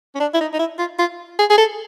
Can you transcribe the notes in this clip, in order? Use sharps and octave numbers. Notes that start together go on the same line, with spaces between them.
C#4
D4
E4
D#4
D#4
E4
F4
F4
G#4
G#4
A4